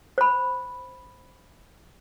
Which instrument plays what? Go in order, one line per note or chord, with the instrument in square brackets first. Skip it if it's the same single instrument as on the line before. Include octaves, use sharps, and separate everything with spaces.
[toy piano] C5 B5